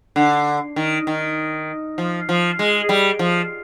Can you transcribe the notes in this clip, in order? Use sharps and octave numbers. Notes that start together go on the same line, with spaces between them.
D3
D#3
D#3
F3
F3
G#3
G3
F3